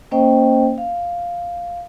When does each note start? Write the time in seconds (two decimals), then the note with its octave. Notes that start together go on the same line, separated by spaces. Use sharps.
0.11 A#3 C#4 C5 D#5 G5
0.78 F5